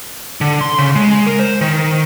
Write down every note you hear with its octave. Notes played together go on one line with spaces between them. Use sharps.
D3
C6
C#3
G#3
A#4
C5
D#3